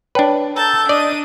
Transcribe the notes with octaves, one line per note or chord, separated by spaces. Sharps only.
D4 B4 C#5 G5 A5
A4 A5 A#5 G6
D4 D5 D#5 D#7